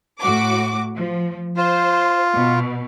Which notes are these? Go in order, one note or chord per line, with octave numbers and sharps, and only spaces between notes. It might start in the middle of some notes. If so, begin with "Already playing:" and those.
A2 F#4 D6
F3
F4 C5
B2